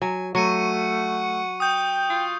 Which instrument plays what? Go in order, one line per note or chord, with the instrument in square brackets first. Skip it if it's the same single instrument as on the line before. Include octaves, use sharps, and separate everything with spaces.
[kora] F#3 [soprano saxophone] G#5
[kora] F#3 [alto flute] A3 [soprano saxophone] F#5 [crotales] C#6 C#7 D#7
[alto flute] G5 [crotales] D#6 G6
[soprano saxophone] F4